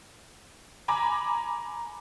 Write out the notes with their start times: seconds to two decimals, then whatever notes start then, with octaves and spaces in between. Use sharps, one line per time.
0.88 G#5 A#5 B5 D6